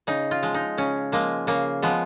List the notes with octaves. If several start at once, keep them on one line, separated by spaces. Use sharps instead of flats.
C#3 D#4
F4
F3 G#3
D#4
C#3 C#4
F3 G#3 A#3
C#3 A#3
F3 G#3 B3